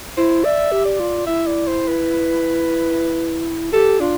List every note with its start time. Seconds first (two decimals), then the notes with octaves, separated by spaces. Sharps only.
0.17 E4 C5
0.44 D5 E5
0.72 G4
0.85 D5
0.99 F4
1.26 E4 E5
1.47 D5
1.67 C5
1.88 B4
3.73 G4 A4
4.00 D4 F4